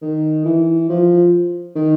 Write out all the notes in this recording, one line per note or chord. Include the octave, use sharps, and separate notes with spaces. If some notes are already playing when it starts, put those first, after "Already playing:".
D#3
E3
F3
D#3